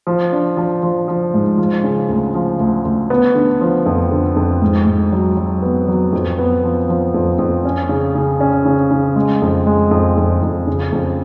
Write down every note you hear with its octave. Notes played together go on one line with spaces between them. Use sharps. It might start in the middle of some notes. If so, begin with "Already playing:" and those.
F3
D4
F3
F3
F3
G#2
F3
C#3
D2
F3
D2
D2
B3
D3
F3
F2
D3
F2
G#2
G#2
F#3
F#3
B3
F#3
F2
B3
F3
F3
F2
F2
C#4
C#3
C#3
C#4
C#3
C#3
G#3
F2
G#3
F2
F2
F2
C#3
F2